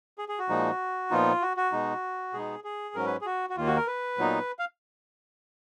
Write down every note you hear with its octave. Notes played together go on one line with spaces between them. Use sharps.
G#4
G#4
F#4
A#2 F3 G#3 D#4
A#2 F3 B3 D#4 F4
F#4
F#4
B2 G#3 D#4
B2 G#3 B3 D#4 G#4
G#4
G#2 F#3 C#4 A#4
B4
G#4
F#4
F#4
D#2 D#3 A#3 F4
F#4
A#4
B4
A#2 F#3 B3 D#4
F5